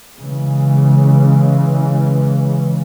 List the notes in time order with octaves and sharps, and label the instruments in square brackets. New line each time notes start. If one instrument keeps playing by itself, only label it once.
[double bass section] C#3 E3 G#3